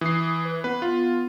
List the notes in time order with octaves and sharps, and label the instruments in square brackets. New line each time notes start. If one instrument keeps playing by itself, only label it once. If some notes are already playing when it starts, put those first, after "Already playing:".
[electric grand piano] E3 C7 [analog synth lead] D#6
[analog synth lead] B4
[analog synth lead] B3 [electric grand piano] B4
[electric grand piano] F4